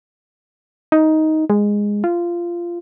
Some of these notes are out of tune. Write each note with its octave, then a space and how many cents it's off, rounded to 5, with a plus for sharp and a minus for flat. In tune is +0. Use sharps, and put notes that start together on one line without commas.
D#4 +10
G#3 -10
F4 -15